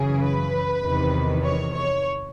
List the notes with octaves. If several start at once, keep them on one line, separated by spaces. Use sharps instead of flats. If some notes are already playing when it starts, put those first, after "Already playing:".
Already playing: F#2 C#3 E3 G#4
B4
E2 C3 D#3
C#5
C#5